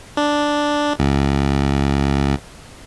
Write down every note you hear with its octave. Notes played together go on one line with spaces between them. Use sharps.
D4
C#2